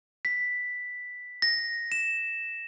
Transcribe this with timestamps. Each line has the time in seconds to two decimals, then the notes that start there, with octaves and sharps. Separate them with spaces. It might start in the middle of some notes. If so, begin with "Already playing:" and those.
0.25 B6
1.42 A#6
1.92 E7